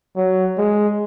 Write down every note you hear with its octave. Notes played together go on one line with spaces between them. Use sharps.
F#3
G#3